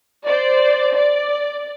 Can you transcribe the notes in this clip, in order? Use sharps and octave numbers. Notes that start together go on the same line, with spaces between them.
C5 D5
D5